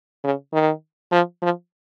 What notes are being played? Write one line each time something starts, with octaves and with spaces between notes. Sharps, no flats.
C#3
D#3
F3
F3